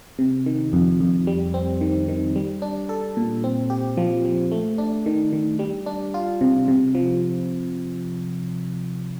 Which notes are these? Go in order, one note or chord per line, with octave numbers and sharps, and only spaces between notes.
C3
D#3
F2
F2
G3
C4
D#3
D#3
G3
D4
A4
A#2
C4
G4
F3
F3
A3
D4
D#3
D#3
G3
D4
F4
C3
C3
F3